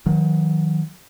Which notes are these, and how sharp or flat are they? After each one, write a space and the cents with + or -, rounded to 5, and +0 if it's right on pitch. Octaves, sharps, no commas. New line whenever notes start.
D#3 +25 F#3 -25